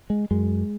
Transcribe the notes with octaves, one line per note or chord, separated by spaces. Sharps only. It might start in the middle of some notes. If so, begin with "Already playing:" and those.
G#3
F#2 G#3